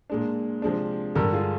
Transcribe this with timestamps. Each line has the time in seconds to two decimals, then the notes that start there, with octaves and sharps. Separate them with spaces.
0.10 A#2 G#3 D4
0.62 C3 F3 G#3 D4
1.15 G2 D3 G#3 G4 A#4
1.33 F4 G#4